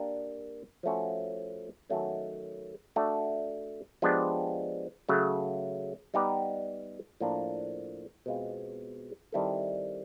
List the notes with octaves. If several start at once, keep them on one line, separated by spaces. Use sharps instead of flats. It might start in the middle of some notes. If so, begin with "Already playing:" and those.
Already playing: A#3 D4 G4 A#4
F3 A3 C#4 F#4
D#3 F#3 A3 C#4
A3 D4 F#4
F3 G#3 B3 D4 G4
C#3 F#3 A3
G3 B3 D#4 G4 B4
A2 F3 A#3 D4
B2 G#3 C4 F4
D#3 G3 C4 E4 A4